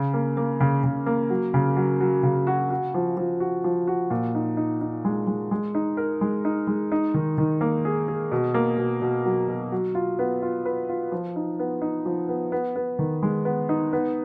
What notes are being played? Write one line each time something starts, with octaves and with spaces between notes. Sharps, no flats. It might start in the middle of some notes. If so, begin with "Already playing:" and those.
Already playing: C#3
A#3
A#3
C#3
C#3
A#3
F#3
C#3
F#3
F#3
C#3
F#4
F#4
F3
F3
F#4
F3
F#4
A#2
D#4
D#4
D#4
G#3
G#3
G#3
D#4
A#4
G#3
D#4
G#3
D#4
D#3
D#3
A#3
G#4
G#4
B2
A#3
B2
B2
F#3
B2
F#3
F4
B3
F4
B4
F4
F3
D#4
B3
D#4
F3
B3
B3
B3
D#3
G#3
B3
D#4
B3